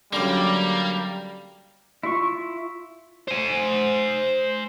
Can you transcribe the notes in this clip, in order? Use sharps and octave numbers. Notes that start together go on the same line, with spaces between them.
F#2 D3 G3 A#3
E4 F4 C#6
C5 G#5